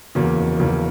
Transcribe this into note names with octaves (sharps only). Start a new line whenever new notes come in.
E2 C#3 F#3 A#3
F1
E2 C#3 F#3 A#3